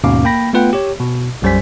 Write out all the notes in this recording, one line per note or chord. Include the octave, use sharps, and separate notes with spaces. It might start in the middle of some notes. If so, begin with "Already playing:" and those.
D#2 G#2 B2 C#4 F5 D6
A#3 G5 B5 A#6
A3 B3 F4 B4 F#5 G5
G4 C#5
B2
B1 F#2 G3 C5 G#5 B6